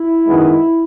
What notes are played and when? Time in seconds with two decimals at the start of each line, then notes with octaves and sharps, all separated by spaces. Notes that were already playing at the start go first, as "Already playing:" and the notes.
Already playing: E4
0.27 F#2 D#3 G#3 B3